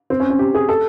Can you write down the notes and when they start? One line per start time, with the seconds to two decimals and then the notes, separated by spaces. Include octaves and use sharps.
0.10 C4
0.20 C#4
0.30 C#4
0.39 G4
0.55 G#4
0.69 A4